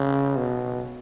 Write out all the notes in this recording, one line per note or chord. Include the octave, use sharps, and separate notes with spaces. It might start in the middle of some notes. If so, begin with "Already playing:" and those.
Already playing: C#3
B2